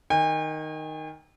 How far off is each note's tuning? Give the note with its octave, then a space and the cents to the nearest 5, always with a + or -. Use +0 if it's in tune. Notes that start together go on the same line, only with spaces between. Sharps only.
D#3 +0 G#5 -45